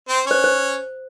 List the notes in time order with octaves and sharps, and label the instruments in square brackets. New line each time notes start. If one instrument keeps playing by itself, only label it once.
[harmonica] C4 C5
[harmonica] C#4 C#5 [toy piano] C5
[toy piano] C5